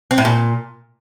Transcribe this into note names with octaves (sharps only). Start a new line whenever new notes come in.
C4
A2
A#2